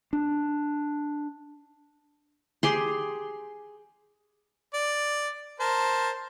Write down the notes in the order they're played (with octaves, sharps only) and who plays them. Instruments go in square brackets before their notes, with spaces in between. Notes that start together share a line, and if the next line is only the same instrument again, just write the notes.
[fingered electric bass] D4
[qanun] G4 G#4 C6
[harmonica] D5
A#4 C5 A5